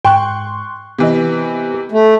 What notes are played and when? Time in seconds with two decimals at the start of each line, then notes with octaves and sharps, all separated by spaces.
0.05 G#2 G5 C6 C#6 F#6
0.99 C3 E3 B3 B4 D#5
1.92 A3